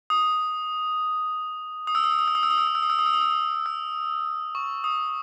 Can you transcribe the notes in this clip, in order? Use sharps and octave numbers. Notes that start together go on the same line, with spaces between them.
D#6
D#6
E6
D#6
E6
D#6
E6
D#6
E6
D#6
E6
D#6
E6
D#6
E6
D#6
E6
D#6
E6
D#6
E6
C#6
D#6